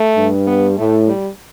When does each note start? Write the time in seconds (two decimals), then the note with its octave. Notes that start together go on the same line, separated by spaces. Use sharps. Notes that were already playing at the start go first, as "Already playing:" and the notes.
Already playing: A3
0.16 G2
0.47 B3
0.77 A2 A3
1.08 G3